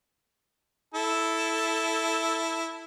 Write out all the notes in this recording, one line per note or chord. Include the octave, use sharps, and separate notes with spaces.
E4 A4